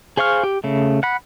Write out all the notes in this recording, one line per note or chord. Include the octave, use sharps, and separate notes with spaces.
G#4 C5 F5 C#6 F6
G4
C#3 A3
F#5 B5